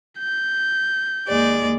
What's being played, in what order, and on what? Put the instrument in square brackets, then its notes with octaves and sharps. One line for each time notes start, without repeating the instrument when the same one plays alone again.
[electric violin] G6
[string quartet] D#2 G#3 D5